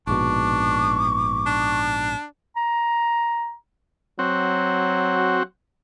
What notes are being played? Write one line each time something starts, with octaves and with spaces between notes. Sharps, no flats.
A#1 G#2 B2 D4 C#6 D6
D4
A#5
F#3 C4 F#4